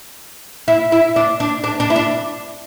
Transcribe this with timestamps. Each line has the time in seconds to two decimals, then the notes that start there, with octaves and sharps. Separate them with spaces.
0.68 E4
0.92 E4
1.16 D4
1.40 D4
1.64 D4
1.80 D4
1.90 E4
1.96 D4